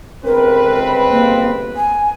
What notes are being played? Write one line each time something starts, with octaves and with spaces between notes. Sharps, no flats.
G1 C#2 C4 A#4 B4
A#3
G#5